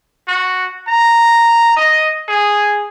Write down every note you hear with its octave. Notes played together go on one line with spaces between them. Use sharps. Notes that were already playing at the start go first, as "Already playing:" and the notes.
F#4
A#5
D#5
G#4